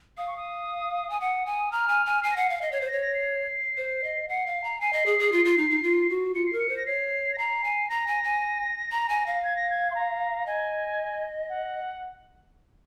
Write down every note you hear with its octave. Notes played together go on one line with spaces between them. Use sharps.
F5 D#6
C#6
D#6
G#5
F#5 D#6
G#5
D#6
A#5 F6
G#5
G#5
G#5 C7
A#6
F#5 C7
F5
D#5
C#5 C7
C5
A#6
C#5
A#6
C7
C5
D#5
F#5 C7
F5
A#5
G#5 C7
D#5
G#4
G#4
F4
F4
D#4
D#4
F4
F#4
F4 C#7
C7
A#4
C#7
C5
A#6
C#5 C7
A#6
A#5 C7
G#5
A#5 A#6
G#5
G#5
A#5
G#5
F5
G#6
A#6
G#6
C6
A#5
D#5 G#5
F#5